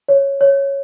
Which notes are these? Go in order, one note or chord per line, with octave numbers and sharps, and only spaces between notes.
C#5
C#5